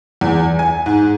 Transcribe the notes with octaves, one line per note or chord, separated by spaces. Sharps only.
E2
G#5
G#2